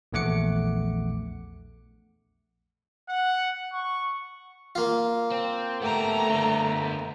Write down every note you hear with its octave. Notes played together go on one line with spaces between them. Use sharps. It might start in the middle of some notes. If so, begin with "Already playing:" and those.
A#1 E2 A3 F#5 D6 C#7
F#5
C#6
A#3 F4
C4
A3 B3 G4 A#5
D3 B3